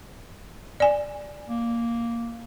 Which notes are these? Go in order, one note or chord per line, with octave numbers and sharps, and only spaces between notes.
D5 G#5
A#3